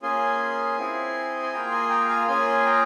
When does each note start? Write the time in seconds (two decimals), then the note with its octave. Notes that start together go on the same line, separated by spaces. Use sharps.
0.02 A#3 C#4 F4 G#4 G#5 C6
0.78 C4 E4 G#4
1.43 C6
1.53 A#3 F4 G#4 G5 A#5
1.71 G#5 C6
1.90 G5 A#5
2.09 F5 G#5
2.28 A#3 C#4 F4 G#4 G#5 C6
2.60 C6
2.66 G5 A#5